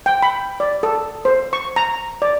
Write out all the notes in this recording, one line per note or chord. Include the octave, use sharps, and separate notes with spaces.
G5
B5
D5
A4
C5
C#6
A#5
D5